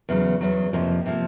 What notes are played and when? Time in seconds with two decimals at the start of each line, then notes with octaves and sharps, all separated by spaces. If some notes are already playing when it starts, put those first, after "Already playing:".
0.09 E2 C#3 F#3
0.41 E2 C#3 F#3
0.73 F2 C3 F3 A#3
1.06 C3 F3 A#3